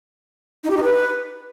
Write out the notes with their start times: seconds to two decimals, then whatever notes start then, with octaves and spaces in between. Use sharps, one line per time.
0.64 D#4
0.70 G4
0.77 D#4
0.83 B4